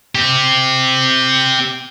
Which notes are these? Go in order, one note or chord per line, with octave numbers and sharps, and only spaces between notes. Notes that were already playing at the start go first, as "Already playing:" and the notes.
C4 G4